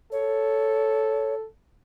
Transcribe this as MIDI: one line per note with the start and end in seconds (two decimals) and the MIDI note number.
0.12 1.46 69
0.12 1.35 73